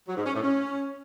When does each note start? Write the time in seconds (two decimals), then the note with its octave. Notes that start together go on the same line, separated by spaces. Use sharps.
0.07 F#3
0.16 G#2
0.25 C#4
0.34 A2
0.43 C#4